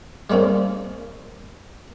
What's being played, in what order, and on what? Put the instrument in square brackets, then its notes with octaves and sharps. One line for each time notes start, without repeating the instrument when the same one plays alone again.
[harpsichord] G3 G#3 A#3 C4 C#4